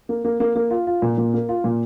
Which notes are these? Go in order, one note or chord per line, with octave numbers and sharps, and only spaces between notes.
A#3
A#3
A#3
A#3
F4
F4
A#2
A#2
A#3
F4
A#2